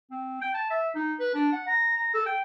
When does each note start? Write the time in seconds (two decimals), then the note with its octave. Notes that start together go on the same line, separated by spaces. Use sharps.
0.11 C4
0.41 G5
0.54 A5
0.70 E5
0.95 D#4
1.19 B4
1.34 D4
1.52 F#5
1.67 A#5
1.96 A#5
2.14 A4
2.26 G5